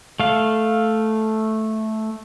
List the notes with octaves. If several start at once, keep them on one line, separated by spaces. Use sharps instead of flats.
A3 F5